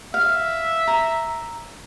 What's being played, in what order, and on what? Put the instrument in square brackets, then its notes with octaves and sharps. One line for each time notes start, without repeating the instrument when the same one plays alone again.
[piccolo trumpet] E5 [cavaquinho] F5
[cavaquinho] A#5